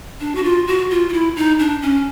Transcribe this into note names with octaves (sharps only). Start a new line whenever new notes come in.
D4
F#4
F4
F#4
F4
F4
E4
D#4
D4
C#4